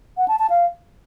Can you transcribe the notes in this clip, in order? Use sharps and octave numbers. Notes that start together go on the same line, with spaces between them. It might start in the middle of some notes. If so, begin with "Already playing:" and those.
F#5
A5
A5
F5